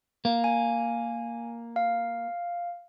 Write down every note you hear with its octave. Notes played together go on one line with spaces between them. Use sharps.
A#3
G#5
F5